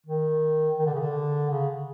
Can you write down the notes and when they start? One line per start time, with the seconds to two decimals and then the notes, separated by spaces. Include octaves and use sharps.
0.07 D#3
0.79 D#3
0.86 D3
0.94 C#3
1.00 D3
1.51 C#3